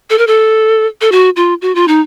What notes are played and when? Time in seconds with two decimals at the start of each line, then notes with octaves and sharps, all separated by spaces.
0.10 A4
0.18 A#4
0.27 A4
1.01 A4
1.12 F#4
1.36 F4
1.62 F#4
1.75 F4
1.88 D#4